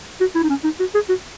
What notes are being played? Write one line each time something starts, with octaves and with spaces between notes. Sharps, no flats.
F#4
E4
D#4
C#4
D#4
F#4
G#4
F#4